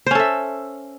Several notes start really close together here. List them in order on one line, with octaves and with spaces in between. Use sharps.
C5 C#4 A4 E5